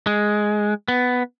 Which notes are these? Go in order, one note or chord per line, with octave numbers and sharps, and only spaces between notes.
G#3
B3